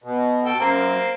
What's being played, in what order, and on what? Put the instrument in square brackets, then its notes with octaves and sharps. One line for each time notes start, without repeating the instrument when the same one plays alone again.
[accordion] B2
[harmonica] A4 G5
[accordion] F#2 [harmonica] A#3 C4